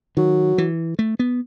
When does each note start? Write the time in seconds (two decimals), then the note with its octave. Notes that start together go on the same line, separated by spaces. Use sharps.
0.17 D#3 F#3
0.58 E3
0.99 A3
1.19 B3